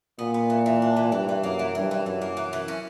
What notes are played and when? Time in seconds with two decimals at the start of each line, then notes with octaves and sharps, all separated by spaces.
0.19 A#2 B3
0.34 B3
0.50 E3
0.66 E3
0.82 D4
0.97 E3
1.12 G2 E3
1.29 E3
1.44 F#2 A#3
1.59 E3
1.75 G2 E3
1.91 E3
2.06 F#2 E3
2.22 A#3
2.37 E3
2.53 E3
2.68 C#4